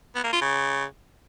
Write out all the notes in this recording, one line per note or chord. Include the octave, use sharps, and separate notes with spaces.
B3
A#3
F4
C#3